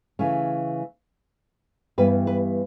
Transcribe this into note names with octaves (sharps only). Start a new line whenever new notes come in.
C#3 E3 A3 C#4
G2 E3 G3 B3 B4
B4